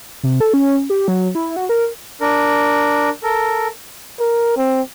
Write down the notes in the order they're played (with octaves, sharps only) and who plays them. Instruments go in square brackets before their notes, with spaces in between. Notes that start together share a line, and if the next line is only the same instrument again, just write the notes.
[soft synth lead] C3
A4
C#4
G4
F#3
E4
F#4
A#4
[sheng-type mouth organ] D4 A#4
A4 A#4
[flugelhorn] A#4
C4